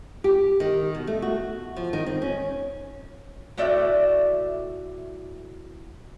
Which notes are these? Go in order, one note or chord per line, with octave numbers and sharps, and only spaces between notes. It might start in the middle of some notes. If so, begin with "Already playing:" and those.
G4
D#3
B2
A3
F#4
F3
D#3
C4
C#4
A2 A3 F#4 D5 E5